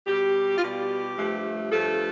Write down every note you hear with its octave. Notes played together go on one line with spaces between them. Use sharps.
B2 G3 G4
F4
B2 G3 G4
G2 F3 A3
G2 F3 A3 A4